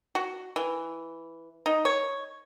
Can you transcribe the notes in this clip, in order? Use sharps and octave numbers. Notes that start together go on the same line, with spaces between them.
F#4
E3
D#4
C#5